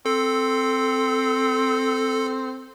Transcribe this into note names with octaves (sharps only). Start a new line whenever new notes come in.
C4 A4